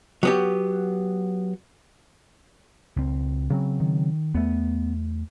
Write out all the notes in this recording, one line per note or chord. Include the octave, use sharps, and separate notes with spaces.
F#3 B3 G4
C#2 C4
C#3 F#3 C4
D#3
E2 A3 B3